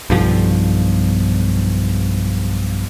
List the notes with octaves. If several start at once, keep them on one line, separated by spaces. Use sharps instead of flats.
B1 G2 F3